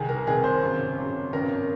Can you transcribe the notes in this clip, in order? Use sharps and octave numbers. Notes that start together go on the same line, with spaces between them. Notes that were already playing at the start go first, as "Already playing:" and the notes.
Already playing: C2 C3 D#3 G#4
A#4
C2 C3 D#3 G#4
C5
G#1 F#2 C#3
G#1 F#2 C#3
G#1 F#2 D#3 A#4